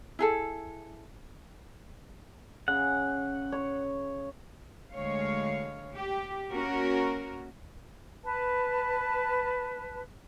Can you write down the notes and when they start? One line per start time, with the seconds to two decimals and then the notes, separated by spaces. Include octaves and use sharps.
0.19 E4 G#4 A4
2.68 C#3 F#5
3.52 C#5
4.92 D2 G#3 C#5 F5
5.96 G4
6.51 A#3 C#4 F#4 A#4
8.24 B4 A5